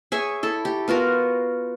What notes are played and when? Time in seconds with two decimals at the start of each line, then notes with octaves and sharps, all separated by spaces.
0.12 G#4 C#5 E5
0.43 E4 A4
0.65 G4
0.88 B3 F4 F#4 A#4